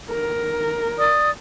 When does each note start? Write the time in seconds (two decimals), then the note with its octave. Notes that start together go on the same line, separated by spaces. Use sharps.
0.11 A#4
0.98 D5 D#6